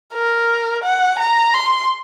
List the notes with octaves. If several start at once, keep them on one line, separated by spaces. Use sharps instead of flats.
A#4
F#5
A#5
C6